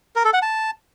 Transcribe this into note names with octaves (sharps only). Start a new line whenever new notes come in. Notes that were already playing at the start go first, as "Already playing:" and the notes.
A#4
A4
F#5
A5